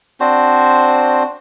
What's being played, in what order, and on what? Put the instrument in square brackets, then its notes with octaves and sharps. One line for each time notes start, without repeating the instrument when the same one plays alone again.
[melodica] C4 D4 F#4 C5